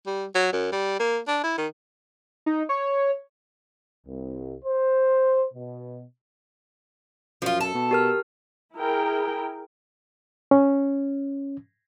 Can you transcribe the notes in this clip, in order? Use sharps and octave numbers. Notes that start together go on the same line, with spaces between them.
G3
F#3
F#2
G3
A#3
D4
E4
D#3
D#4
C#5
C2
C5
B2
F#2 F3 F4
A4
B2
G4 A#4 F6
E4 G#4 A#4 G5
C#4